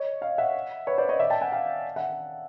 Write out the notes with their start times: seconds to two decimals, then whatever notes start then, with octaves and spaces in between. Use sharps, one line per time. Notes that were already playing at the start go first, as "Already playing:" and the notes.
Already playing: C#5 D#5
0.21 D#5 F5
0.38 E5 F#5
0.87 B4 C#5
0.98 C5 D5
1.09 C#5 D#5
1.20 D5 E5
1.30 G5 A5
1.41 F#5 G#5
1.52 F5 G5
1.96 E5 F#5